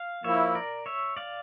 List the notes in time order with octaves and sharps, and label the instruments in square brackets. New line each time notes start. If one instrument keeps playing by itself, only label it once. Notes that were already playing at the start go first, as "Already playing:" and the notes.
Already playing: [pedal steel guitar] F5
[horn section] F3 A#3 E4 [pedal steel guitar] C#5 E5
[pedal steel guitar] A#4 D5
C#5 E5
D5 F5